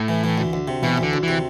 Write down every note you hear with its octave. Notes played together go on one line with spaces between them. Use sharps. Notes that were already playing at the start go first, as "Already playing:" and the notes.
Already playing: A2
E3
E3
D2
D2
C3
B2 E3
D2
D3
D2
C3 E3